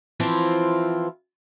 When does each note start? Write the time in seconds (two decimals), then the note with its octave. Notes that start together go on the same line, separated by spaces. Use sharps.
0.20 E3 F3 C4 E4 F4